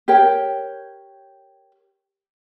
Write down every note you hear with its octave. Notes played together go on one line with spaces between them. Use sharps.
G4 A#4 C#5 G5